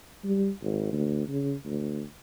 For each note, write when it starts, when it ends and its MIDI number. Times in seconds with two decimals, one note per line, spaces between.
0.24 0.49 55
0.62 0.90 32
0.92 1.24 38
1.28 1.54 49
1.66 2.02 38